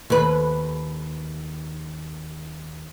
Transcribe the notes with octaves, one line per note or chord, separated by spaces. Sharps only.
D#2 B4